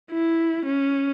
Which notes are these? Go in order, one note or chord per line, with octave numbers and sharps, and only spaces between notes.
E4
C#4